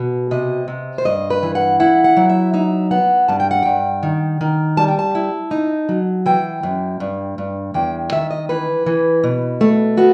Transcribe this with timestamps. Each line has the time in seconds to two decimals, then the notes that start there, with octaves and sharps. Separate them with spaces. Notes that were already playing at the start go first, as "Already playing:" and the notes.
Already playing: B2
0.31 C3 D#5
0.68 C3
0.98 C5
1.05 G2 D#5
1.30 B4
1.43 E3
1.55 F#5
1.80 E4 F#5
2.04 F#5
2.17 F#3
2.29 E5
2.54 D#4 E5
2.91 B3 F#5
3.28 G2 A5
3.40 G5
3.51 F#5
3.63 G2 G5
4.03 D#3
4.41 D#3
4.77 G3 A5
4.88 G5
4.99 A5
5.15 E4
5.51 D#4
5.89 F#3
6.26 E3 G5
6.63 F#2
7.00 G2
7.38 G2
7.74 E2 G5
8.13 D#3 E5
8.31 D#5
8.49 E3 B4
8.86 E3
9.24 B2
9.61 A3
9.97 B3 F#4